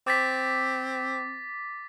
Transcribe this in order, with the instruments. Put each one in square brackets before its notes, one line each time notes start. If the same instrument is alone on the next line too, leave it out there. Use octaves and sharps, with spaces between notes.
[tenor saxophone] C4 [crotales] D6 A6 B6